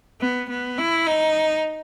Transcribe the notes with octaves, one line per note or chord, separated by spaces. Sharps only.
B3
B3
E4
D#4